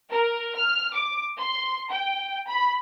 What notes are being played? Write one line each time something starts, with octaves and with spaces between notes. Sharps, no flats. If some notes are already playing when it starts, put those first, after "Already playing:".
A#4
F6
D6
C6
G5
B5